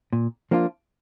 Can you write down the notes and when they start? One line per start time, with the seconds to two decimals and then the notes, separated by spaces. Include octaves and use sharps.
0.13 A#2
0.51 F3 A#3 D4 F4